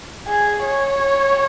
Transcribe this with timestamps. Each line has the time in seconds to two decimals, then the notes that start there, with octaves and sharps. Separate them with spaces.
0.28 G#4
0.64 C#5